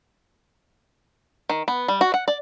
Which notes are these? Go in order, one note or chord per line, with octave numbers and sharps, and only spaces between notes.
D#3
B3
G3
F#4
F#5
D5